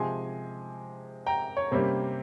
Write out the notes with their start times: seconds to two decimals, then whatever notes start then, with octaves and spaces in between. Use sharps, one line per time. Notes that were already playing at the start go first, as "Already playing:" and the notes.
Already playing: C3 F3 G#3 G#5 C6
1.26 G5 A#5
1.57 C#5
1.71 C3 G3 A#3 C#4 C5